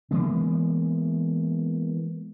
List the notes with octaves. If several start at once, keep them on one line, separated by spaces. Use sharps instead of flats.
E3 G#3 A#3 B3